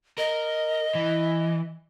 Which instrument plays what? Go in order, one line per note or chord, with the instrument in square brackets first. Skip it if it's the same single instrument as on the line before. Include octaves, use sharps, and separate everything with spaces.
[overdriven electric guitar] A#4 [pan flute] D#5
[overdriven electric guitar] E3